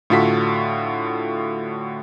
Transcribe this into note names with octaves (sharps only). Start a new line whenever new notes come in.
A2 D3 F4 F#4 A4 B6